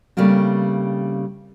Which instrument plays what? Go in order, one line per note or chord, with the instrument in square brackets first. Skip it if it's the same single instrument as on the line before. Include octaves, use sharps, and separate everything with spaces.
[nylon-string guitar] C#3 G3 A3 A#3 C4